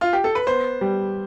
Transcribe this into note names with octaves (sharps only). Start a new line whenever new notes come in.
F4
G4
A4
B4
B3 C5
G3